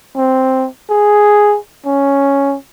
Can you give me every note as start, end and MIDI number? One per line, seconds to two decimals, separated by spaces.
0.16 0.68 60
0.90 1.57 68
1.86 2.56 61